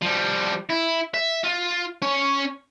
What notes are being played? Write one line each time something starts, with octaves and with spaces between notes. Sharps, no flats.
F3 G3
E4
E5
F4
C#4 C#5